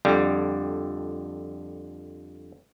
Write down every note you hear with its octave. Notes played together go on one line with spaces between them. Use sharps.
F2 D3 G3